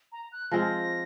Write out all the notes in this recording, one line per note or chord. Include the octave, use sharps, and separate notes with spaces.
A#5
F#6
F3 G#3 C4 F4 A#6